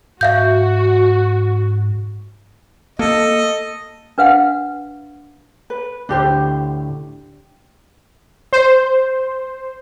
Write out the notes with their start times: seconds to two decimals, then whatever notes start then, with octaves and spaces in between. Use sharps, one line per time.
0.21 G#2 F#4 E5 F5 G6
2.99 A#3 A4 D#5
4.18 D4 B4 F5 F#5
5.70 B4
6.09 D2 A2 D3 D4 G4 C5
8.53 C5